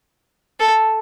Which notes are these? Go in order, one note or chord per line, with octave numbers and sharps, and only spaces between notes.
A4